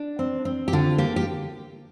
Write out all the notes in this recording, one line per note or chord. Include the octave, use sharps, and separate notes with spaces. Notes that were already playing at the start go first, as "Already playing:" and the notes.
Already playing: D4
C4
C4
G4
D3 F4
A#3 G4
G4